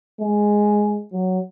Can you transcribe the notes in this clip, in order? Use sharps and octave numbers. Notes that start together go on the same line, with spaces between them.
G#3
F#3